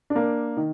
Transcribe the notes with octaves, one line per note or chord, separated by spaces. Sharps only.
D4
A#3
D#3